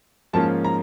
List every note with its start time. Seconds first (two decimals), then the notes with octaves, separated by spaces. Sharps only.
0.33 G#2 F3 A#3 C#4 F4 A5
0.64 A#5